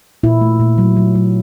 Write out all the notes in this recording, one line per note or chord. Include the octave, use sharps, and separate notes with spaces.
A#2 E4
A3
A#2
F#3
F#3
F#3